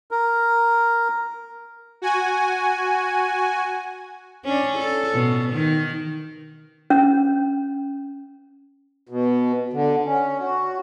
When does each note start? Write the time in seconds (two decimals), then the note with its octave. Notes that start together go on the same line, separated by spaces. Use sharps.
0.11 A#4
2.02 F#4 G#5
4.44 C#4 D4
4.78 A4
5.14 B2
5.53 D#3
6.90 C#4
9.09 B2
9.73 D3
10.06 C#4
10.39 F#4